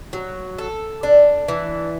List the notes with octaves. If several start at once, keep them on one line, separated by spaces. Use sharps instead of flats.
F#3
A4
D4
E3